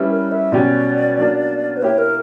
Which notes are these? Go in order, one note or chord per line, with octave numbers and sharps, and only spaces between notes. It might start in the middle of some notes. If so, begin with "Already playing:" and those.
Already playing: G3 C#4 E4 B4
A#4
E5
B2 F#3 C#4 G4 D5
F#3 A#3 D4
B4
A#3 E4 G4 C#5
A#4